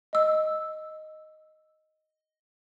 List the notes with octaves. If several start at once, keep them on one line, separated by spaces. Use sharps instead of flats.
D#5 E6